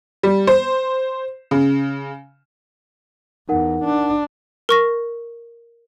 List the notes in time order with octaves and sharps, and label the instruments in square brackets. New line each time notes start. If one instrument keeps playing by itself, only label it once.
[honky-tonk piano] G3
C5
C#3
[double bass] E2 [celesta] D#4 A#4 F#5
[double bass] D4
[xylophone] A#4 C#6 A#6